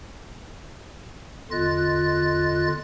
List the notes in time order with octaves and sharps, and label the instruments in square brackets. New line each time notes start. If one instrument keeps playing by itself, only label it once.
[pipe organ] E2 D3 F4 D#5 F#6 A6